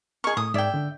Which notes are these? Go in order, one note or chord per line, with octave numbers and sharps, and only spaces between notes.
G#4 D#5 C#6 F6
A2 D#6
G#2 D5 E5 G5 G#6
D3 D4